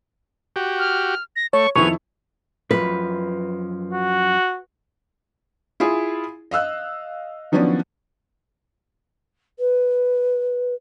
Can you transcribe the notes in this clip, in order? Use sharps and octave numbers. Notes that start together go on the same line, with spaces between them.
F#4 G4
F6
A#6
A3 C#5 C#6
F2 D#3 B3 E4 G#4 C#6 F7
F#2 F3 B4
F#4
E4 F4 G#4
D#5 F5 E6 F#6
D#3 F3 F#3 B3 C#4 D4
B4